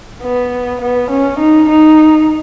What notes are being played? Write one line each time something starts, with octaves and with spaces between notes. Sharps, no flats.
B3
B3
C#4
D#4
D#4